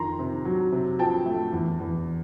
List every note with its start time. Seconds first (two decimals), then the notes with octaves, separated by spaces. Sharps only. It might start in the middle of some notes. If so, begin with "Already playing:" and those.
Already playing: F2 D#3 A#5 C6
0.19 C3
0.45 F#3
0.72 C3
0.99 F3 G5 A5
1.26 A3
1.52 E2
1.79 E2